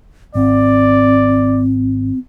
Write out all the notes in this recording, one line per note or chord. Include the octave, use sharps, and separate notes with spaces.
G#1 C4 D5